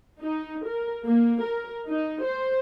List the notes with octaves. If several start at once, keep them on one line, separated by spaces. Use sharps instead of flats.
D#4
A#4
A#3
A#4
D#4
C5